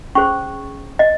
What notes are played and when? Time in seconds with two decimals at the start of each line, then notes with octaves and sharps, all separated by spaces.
0.15 C#4 G#4 C5 C#6
0.99 D#5